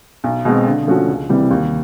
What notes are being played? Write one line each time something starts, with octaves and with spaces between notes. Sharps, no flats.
B1
B2 G#3 C4
D3
F3 A3 C#4 F#4
C#2
C3 E3 G3 C4
D#2